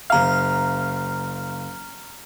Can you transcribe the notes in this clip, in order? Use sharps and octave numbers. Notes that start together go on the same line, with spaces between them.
F#1 F5 A#5 F6